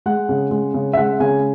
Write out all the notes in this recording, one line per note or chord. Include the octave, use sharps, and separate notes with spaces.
G#3 F#5
C#3
G#3
C#3
E5
G#3 F#5
C#3 G#5